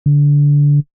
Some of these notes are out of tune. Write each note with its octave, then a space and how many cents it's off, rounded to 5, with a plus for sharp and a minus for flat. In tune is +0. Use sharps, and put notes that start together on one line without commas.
D3 -20